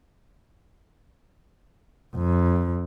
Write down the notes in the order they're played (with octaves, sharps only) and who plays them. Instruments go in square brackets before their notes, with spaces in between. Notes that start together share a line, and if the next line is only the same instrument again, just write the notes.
[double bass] F2